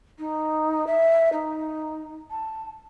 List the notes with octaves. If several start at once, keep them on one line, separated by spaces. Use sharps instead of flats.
D#4
E5
D#4
A5